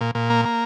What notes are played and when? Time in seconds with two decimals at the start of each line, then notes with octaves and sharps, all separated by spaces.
0.01 A#2
0.15 A#2
0.30 A#3
0.45 A#3